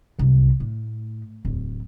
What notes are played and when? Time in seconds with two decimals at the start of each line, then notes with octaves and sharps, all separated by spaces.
0.19 F#1 C2
0.60 A2
1.45 D1 E2